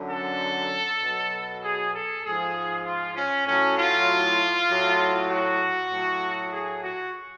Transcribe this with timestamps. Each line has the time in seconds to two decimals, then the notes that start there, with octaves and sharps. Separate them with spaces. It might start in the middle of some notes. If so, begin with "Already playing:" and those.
Already playing: F#2 D3 F#3
0.10 A4
1.01 B2 F#3
1.63 G#4
1.93 A4
2.24 G#2 F3 G#4
2.85 F4
3.16 C#4
3.46 A2 F#3 C#4
3.78 F4
4.70 A2 F#3
5.30 F#4
5.91 A2 F#3
6.52 G#4
6.83 F#4